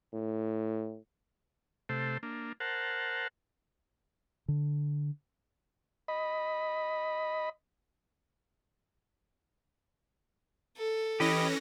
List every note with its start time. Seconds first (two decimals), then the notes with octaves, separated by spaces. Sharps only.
0.13 A2
1.89 C3 A3 A4 C5
2.23 A#3 D4
2.60 A#4 C5 F#5 A5
4.48 D3
6.08 D#5 B5
10.77 A4
11.20 E3 C#4 G4 B4 D#5 A#6